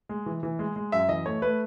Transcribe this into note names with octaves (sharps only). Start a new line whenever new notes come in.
G#3
E3
E3
G#3
G#3
F#2 E5
E3 D#5
A3 C#5
A3 B4